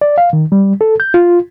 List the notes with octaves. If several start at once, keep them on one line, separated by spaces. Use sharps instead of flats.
D5
F5
D#3
G3
A4
G6
F4